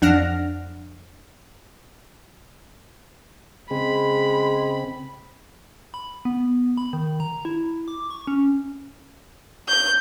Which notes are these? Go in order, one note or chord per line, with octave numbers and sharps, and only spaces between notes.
F2 D4 F#5 F6 A#6
C#3 G#3 C4 B5
B5
B3
B5
D#3
A#5
E4
D6
C#6
C#4
G6